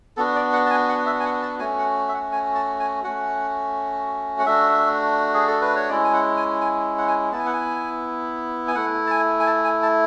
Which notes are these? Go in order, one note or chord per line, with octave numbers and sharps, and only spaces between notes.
B3 D4 F#4 A4
D5
F#5
A5
G#5
F#5
E5
G#5
F#5
A5
A3 C#4 F#4 G#5
F#5
E5
F#5
G#5
A5
G#5
A3 C#4 F#4 F#5
F#5
A3 D4 F#4 E5
G#4
A4
B4
C#5
G#3 C#4 E4 D5
G#5
F#5
G#5
G#5
F#5
G#5
B3 E4 A5
G#5
F#5
G#5
G#5
A3 E4 F#5
A5
G#5
G#5
A5
G#5
A5